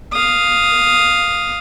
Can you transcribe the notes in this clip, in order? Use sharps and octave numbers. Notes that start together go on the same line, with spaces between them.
F5 D#6